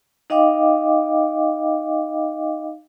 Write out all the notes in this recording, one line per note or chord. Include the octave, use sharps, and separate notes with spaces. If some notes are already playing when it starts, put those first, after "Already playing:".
D#4 D#5 F5 G5 D6